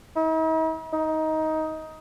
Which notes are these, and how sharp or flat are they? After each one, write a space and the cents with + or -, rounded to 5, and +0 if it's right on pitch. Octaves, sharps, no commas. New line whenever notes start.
D#4 +45
D#4 +15